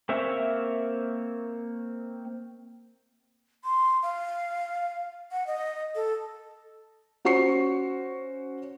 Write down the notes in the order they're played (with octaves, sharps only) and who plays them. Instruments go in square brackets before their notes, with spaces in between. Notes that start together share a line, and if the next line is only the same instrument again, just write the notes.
[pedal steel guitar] A#3 C4 C#5 E5
[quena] C6
F5
F#5
D#5
A4
[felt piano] C#4 F#4 C5 C#6 C7 C#7